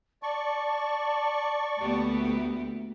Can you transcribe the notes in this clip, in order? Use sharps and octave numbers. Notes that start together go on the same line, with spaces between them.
D5 A5 C#6
D2 A#3 B3 G4